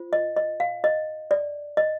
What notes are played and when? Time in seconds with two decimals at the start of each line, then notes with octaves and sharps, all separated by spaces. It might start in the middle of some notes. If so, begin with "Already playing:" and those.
Already playing: F4 C5
0.13 D#5
0.37 D#5
0.60 F5
0.84 D#5
1.31 D5
1.77 D#5